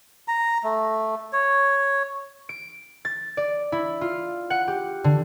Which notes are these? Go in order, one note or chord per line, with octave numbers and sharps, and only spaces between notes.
A#5
A3
C#5
D7
A6
D5
E4
F4
F#5
G4
D3